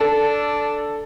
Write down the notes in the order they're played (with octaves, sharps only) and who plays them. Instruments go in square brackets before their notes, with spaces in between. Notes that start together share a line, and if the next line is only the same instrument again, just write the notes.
[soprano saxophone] D4 [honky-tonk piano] A4